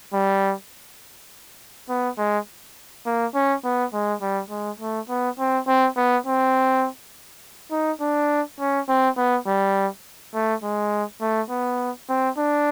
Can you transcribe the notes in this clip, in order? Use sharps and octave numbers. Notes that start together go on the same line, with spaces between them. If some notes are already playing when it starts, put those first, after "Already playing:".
G3
B3
G#3
A#3
C#4
B3
G#3
G3
G#3
A3
B3
C4
C4
B3
C4
D#4
D4
C#4
C4
B3
G3
A3
G#3
A3
B3
C4
D4